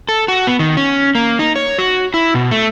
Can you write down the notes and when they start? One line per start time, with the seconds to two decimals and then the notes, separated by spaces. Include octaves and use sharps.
0.09 A4
0.28 F#4
0.47 B3
0.59 D#3
0.77 C#4
1.15 A#3
1.39 D#4
1.56 C#5
1.78 F#4
2.14 E4
2.34 B2
2.51 A3